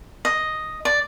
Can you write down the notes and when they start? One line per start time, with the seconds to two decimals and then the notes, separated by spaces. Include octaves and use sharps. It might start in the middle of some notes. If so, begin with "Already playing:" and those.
0.25 D#5
0.85 D5